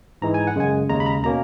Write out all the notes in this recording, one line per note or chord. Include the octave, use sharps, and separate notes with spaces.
G#2 E3 G#3 A#5
G#5
F#5
F#2 C#3 G#3 G#5
D#2 C#3 G#3 A#5
B5
A#5
B2 A#3 C#4 A#5